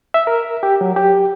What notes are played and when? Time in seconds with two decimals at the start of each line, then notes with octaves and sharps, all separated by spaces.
0.14 E5
0.27 A#4
0.63 G4
0.81 F#3
0.96 G4